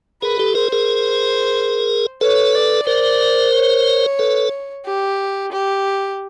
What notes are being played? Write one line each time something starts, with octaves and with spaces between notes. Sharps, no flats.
G#4 A#4 B4
G4 A4
G#4 A#4 C5
G#4 A#4
A4 B4 C#5
D5
A#4 C5 D5
C#5
A4 B4
G4
G4